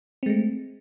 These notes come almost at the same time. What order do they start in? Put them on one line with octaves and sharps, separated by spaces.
C4 G#3 A3